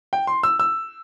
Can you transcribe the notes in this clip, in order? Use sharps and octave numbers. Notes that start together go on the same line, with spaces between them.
G5
C6
E6
E6